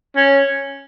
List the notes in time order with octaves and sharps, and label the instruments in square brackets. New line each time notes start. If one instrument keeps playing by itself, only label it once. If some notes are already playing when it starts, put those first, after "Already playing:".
[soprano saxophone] C#4